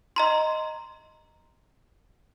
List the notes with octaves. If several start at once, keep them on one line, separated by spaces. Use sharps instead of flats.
D#5 A#5 C6